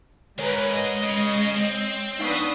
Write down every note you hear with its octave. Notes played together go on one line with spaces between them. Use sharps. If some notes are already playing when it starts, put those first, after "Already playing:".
D#2 G#2 G#3 G#4 A#4 B4 C#5
D#5
C#3
C4
B3 D4 D#4 B4 F5 C#6 D#6